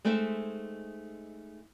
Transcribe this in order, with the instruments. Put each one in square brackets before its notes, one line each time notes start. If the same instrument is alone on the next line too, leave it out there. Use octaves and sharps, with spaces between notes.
[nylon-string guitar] G#3 A3 C4 D#4 E5